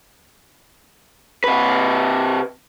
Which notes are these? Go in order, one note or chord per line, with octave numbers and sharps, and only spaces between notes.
C3 B4